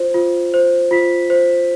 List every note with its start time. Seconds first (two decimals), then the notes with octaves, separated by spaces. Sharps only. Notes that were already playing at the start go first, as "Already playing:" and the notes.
Already playing: F4 C5
0.14 F4
0.54 C5
0.91 F4 B6
1.30 C5